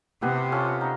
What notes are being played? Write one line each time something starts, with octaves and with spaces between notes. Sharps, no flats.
C3 B3 E4 G4 B4
C#4 F4 A4
D#4